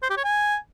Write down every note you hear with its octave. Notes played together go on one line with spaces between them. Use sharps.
C5
G4
C#5
G#5